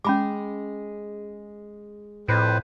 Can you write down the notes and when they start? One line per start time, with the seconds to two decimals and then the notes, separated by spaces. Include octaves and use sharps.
0.05 G#3 C#4 G#4 B5 D6
2.28 F2 A2 B4 C5